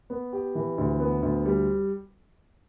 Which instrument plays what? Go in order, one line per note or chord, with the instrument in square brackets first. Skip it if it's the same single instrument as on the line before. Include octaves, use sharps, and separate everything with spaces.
[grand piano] B3
G4
E3
D2
B3
D2
G3